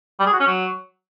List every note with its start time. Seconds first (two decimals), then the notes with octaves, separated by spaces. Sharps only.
0.20 G3
0.26 G#4
0.33 F#4
0.40 C#4
0.47 F#3